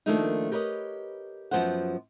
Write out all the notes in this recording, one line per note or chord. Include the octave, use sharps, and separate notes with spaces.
D#3 F3 A3 A#3 D4 D#4
G4 A#4 B4 C#5 D#5
F#2 D#3 F3 B3 C5 F#5